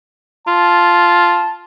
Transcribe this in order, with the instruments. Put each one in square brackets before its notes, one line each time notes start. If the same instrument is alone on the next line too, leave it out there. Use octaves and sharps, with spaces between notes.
[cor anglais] F4 [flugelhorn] A5